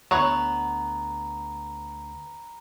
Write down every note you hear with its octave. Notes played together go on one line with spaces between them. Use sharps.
D2 B3 C#5 F#5 A#5 B5